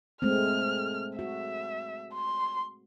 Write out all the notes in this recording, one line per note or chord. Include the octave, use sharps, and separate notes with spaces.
G#3 A3 C4 F6
F#4 E5
C6